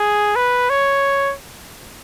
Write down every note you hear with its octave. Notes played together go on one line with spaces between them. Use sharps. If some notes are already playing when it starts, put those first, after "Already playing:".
Already playing: G#4
B4
C#5